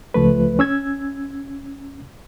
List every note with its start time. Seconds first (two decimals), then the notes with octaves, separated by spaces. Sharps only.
0.14 C#2 F3 A3 B4
0.59 C#4 E6 G#6